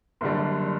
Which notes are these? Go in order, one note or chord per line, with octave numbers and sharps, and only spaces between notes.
F#1 F#2 D3 G3